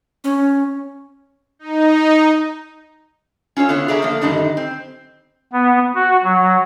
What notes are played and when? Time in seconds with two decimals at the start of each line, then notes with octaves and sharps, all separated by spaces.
0.24 C#4
1.59 D#4
3.57 C#4 F4 A4 C#5
3.69 D3 B3 E4 F4 A4 C#5
3.88 G#4 C#5 D5 E5 A#5
4.02 D3 F3 A3 A#3 D4
4.21 F#2 A2 D3 D#3 G3 D#4
4.57 C4
5.53 B3
5.95 F#4
6.24 F#3